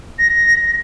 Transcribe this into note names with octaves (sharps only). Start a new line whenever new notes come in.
A#6